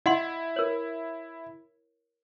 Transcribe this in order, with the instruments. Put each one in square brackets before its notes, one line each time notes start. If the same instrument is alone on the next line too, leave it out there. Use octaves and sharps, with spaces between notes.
[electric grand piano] E4 [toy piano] D#5 F#5 C6
[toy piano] A#4 C#5